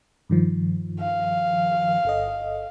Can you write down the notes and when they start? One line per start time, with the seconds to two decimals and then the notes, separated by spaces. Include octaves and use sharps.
0.29 G2 D#3 F3
1.00 F5
2.05 G1 A4 D#5